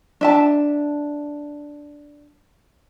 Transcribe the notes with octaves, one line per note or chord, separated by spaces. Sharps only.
D4 E5 A5